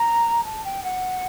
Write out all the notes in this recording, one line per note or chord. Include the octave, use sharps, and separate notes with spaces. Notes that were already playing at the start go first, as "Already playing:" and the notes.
Already playing: A#5
A5
G5
F#5